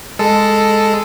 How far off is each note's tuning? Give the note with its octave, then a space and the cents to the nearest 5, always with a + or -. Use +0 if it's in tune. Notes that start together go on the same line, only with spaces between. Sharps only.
G#3 +0 A4 +0